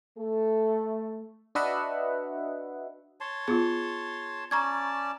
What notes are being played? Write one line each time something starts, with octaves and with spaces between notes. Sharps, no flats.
A3 A4
D4 F#4 B4 D#5 E5 F#5
C#5 A5 C6
B3 F4 G#4
C#4 D5 A5 A#5 C#6 G#6